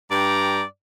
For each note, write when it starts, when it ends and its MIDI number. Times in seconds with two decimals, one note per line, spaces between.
0.11 0.63 43
0.11 0.63 74
0.11 0.63 79
0.11 0.63 82